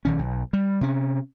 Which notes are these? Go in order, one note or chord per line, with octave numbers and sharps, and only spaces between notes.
A#1 D#3 C#4
B1
G3
C3 C#4